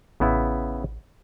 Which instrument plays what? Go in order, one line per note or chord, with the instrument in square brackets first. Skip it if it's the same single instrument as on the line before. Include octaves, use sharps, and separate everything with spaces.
[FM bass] A1 [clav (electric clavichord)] C#3 B3 E4